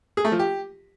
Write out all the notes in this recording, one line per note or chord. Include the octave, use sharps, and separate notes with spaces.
G#4
A3
F3
G4